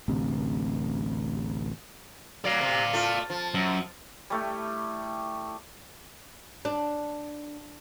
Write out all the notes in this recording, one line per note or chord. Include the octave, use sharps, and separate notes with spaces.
A1 D2 C3
F#3 D5 F5
C3
A3 F4
F3
F#2
G3 A3 E4
D4